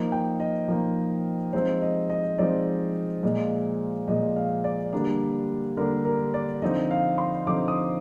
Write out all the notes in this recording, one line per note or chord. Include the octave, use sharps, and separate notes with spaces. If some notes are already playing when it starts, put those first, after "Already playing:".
Already playing: F3 A#3 D#4
G5
D#5
F3 A#3 D#4
F3 G#3 C4 D#4 C5
D#5
D#5
F3 G#3 C4 D#4 D5
A#2 F3 G#3
A#2 F3 G#3 D#5
F5
D5
D3 G3 A#3 D4
D3 G3 A#3 D4 A#4
A#4
D5
D3 F3 C4 D#4 D#5
F5
C6
D3 F3 C4 D#4 D6
D#6